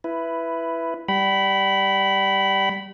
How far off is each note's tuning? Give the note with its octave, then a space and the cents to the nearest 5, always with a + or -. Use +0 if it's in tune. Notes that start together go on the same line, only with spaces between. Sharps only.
E4 +10 B4 +0
G3 +0 G5 -40 B5 +0